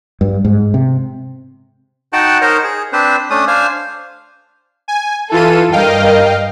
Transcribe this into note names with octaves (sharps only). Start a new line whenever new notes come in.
G2
G#2
C3
D#4 F#4 F#5 G5 A5
D#4 A#4 C5 C#5 D#5
G#4
C4 D4 B4 C5
A3 C#4 D4 D#6
D4 C5 F5 G#5
G#5
E3 F4 A4 D#7
G2 A#4 D#5 F5 G5